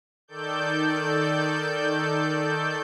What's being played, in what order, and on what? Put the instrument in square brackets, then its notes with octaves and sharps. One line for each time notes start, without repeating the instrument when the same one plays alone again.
[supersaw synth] D#3 A4 D5 G6